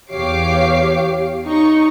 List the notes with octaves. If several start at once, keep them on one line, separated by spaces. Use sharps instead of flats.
E2 G4 C#5 F5 D6 C7
D#4 C#6